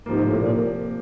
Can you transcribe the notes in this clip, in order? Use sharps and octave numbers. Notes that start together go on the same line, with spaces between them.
G#2 C3 F3 A#3
A2
A#2